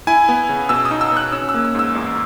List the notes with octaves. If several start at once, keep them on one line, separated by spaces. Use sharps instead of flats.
E4 G#5
B3
C#3
B2 E6
D#6
D#4
E6
B2 F#6
C#4 E6
E6
A#3
E6
G#2 E6
E2